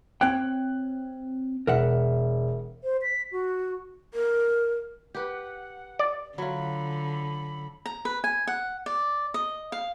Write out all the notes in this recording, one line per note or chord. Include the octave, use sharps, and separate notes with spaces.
C4 C#5 G5 F#6
E1 A#4 E5 F#5
C5
B6
F#4
A#4
G4 B4 F#5
D5
D3 F#3 F4 B5
A#5
B4
G#5
F#5
D5
D#5
F5